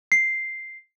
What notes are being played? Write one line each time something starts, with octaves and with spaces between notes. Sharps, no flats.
C7